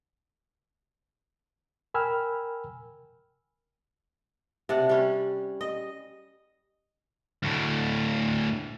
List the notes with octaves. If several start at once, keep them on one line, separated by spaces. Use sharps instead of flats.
A#4 G5 G#5 B5 E6 F6
C3 D4 F#5
G3 C#4
D#5
D2 A2